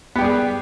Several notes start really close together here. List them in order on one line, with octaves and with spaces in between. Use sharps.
B3 G4 G3 G#4